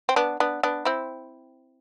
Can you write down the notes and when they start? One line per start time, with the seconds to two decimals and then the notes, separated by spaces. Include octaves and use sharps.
0.09 C4
0.16 B3 D4
0.40 B3 D4
0.63 B3 D4
0.85 C4 E4